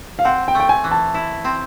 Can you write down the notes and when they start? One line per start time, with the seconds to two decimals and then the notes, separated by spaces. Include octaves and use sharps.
0.19 F5
0.25 C4 F#5
0.48 G5
0.55 A3
0.60 G5
0.69 G#5
0.84 E3
0.91 A5
1.14 E4
1.44 C4